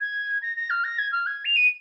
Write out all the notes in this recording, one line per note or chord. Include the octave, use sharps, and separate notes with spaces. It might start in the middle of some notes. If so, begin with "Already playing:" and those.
G#6
A#6
A#6
F6
A#6
G#6
F6
G#6
F7
D#7